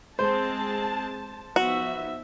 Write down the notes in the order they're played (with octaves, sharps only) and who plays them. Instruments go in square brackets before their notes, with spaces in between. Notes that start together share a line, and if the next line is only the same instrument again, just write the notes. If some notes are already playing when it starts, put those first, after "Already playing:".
[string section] G#3 C4 [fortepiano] C5 [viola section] A5
[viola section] F3 D#4 E5 [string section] B3 [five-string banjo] F#4